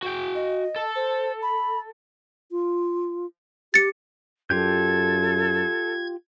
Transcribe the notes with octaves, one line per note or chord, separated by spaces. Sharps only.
F#4 G5
D#5
A4
C5
B5
F4
G4 A6 C#7
F#2 F4 G4 A4 G6 G#6